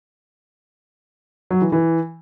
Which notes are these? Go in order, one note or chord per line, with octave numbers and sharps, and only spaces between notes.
F#3
E3
E3